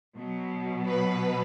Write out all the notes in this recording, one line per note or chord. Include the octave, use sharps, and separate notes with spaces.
B2 F#3
B4